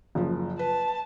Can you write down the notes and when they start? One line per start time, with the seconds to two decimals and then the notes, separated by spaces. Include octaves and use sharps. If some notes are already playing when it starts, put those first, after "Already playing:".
0.15 F#1 F3
0.59 B4 A5